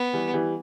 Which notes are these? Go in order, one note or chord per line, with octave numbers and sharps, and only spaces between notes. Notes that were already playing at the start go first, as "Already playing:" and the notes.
Already playing: B3
E3 G3
E3 G3